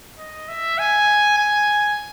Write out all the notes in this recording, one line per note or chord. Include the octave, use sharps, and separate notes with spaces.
D#5
E5
G#5
G#5